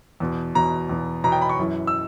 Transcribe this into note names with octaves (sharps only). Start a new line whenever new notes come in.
E2 B2
E2 B2 A#5
E2 B2
E2 B2 A#5
G5
B5
C#6
F#2 E3
E6